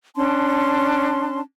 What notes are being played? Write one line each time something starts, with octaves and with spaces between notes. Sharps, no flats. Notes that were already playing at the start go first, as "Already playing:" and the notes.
C#4 D4 A5 C6